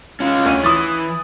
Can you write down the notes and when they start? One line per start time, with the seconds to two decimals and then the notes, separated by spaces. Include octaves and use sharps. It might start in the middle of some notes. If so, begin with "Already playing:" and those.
0.20 C#4 F4
0.45 D2 C#5 D#7
0.64 E3 D#6 A6